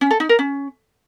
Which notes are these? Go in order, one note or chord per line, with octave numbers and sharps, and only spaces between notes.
C#4
A4
D#4
A#4
C#4